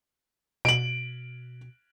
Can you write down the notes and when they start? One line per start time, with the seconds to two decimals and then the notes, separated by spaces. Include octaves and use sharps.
0.65 B2 D7 F#7